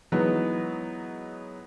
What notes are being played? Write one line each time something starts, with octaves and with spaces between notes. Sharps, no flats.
E3 F#3 G#3 B3 D#4